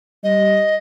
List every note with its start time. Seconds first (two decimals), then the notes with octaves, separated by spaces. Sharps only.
0.24 G3 D#5